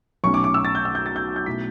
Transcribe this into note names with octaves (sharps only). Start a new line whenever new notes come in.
B1 B2 A3 C#4 C#6
D6
D6
E6
A6
G6
E6
G6
A6
G6
G6
B2 A3 E4 B6